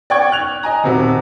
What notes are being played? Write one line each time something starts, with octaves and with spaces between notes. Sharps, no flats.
D5 F#5 G5 C#6 G#6
F#6 F7
D#5 G#5 A#5
D#1 C3 F#4